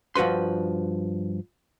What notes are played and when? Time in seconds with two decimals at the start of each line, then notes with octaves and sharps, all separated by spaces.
0.16 G2 F3 F#4 B4 C6